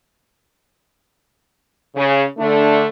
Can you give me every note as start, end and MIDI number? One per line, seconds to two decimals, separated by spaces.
1.96 2.23 49
2.39 2.86 50
2.39 2.86 57
2.39 2.86 62